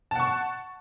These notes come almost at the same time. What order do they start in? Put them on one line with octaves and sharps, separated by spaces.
A5 F#5 C#6